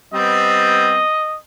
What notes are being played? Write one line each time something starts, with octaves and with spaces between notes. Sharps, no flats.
G3 B3 C4 D#5